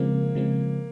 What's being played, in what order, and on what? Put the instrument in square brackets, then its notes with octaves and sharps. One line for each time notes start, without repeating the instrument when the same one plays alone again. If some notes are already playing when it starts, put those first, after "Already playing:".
Already playing: [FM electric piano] C#3 F3 G#3 C4 [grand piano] A#3
[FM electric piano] C#3 F3 G#3 C4